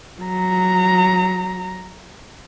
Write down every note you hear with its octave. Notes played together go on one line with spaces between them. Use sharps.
F#3 A#5